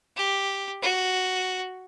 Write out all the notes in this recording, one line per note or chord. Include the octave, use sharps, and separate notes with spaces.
G4
F#4